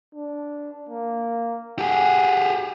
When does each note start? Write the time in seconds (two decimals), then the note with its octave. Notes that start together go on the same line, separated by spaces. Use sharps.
0.14 D4
0.89 A#3
1.79 G4 G#4 F#5